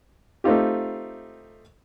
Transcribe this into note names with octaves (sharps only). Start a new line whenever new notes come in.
A3 C4 D#4 F4 G4